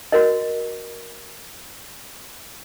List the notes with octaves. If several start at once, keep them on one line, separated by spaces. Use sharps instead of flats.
F#4 A#4 D#5